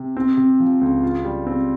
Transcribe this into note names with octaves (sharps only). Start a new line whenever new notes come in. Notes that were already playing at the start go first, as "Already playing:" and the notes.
Already playing: C3
C4
C3
F3
C#2
F4
G3
C4